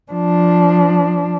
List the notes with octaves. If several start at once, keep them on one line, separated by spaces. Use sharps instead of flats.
F3 D4